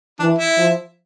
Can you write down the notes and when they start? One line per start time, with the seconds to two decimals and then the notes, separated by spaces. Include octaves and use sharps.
0.19 E3 D4
0.39 E4
0.57 F3